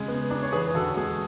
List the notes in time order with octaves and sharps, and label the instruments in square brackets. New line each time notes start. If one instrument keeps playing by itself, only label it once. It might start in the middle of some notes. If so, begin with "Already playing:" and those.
Already playing: [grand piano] C#3 G#3 G#4
B3
D4
C#5
E2 G#4 B4
D3 F#4 A4
G#3 G#4